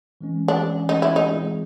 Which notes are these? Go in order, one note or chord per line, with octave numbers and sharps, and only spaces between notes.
E3 G#3 C#4
D4
E3 G#3 C#4
D#4
E4
D#4
E3 G#3 C4 F4 G#4